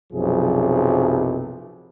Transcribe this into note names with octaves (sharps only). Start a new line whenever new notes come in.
B1 F#2 C3 F3 G#4